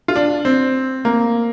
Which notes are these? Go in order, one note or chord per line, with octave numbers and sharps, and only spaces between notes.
F4
D4
C4
A#3